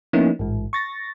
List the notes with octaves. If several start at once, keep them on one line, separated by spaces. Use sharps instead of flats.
F3 A#3 B3 C#4 D#4 E4
A1 G#2
C#6 A6 A#6